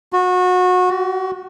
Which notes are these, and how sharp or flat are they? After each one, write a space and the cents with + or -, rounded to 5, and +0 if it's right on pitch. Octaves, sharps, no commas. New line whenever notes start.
F#4 -25
F#4 +35